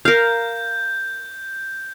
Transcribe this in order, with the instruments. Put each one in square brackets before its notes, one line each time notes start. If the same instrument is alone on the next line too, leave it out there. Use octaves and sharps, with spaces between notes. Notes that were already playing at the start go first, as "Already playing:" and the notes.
[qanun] A#4 F5 [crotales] G6